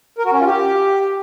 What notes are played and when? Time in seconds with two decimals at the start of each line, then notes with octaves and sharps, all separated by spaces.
0.18 A#4
0.25 F#4
0.32 C#4
0.39 F4
0.46 G4